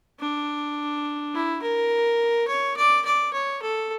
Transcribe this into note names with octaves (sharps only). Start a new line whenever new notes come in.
D4
E4
A#4
C#5
D5
D5
C#5
A4